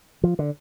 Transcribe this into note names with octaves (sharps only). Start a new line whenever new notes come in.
F3
D3